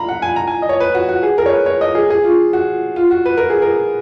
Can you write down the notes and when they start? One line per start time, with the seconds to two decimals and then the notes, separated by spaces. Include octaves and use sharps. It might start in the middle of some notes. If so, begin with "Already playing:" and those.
Already playing: F5 A#5 B5
0.09 F#5
0.22 G#5
0.36 A#5
0.47 G#5
0.62 D#5
0.69 C#5
0.80 B4
0.95 F#4
1.09 F#4
1.23 G#4
1.38 A#4
1.46 C#5
1.52 B4
1.66 C#5
1.81 D#5
1.95 G#4
2.10 G#4
2.24 F4
2.53 F#4
2.96 F4
3.11 F#4
3.26 B4
3.38 A#4
3.50 G#4
3.62 A#4